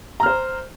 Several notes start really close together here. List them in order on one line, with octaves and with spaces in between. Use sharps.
A#5 F6 C5